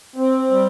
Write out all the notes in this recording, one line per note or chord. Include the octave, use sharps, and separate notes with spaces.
C4
G3